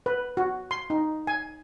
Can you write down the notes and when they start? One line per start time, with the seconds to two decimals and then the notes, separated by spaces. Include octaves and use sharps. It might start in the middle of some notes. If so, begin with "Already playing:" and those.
0.06 B4
0.37 F#4
0.71 C6
0.90 D#4
1.27 G#5